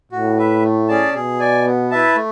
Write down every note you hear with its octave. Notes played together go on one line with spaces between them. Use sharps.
A2 F#4
B4 E5
A3
C#4 G#4 D5 A5
B2 G#4
D5 G#5
B3
E4 B4 E5 A5
A3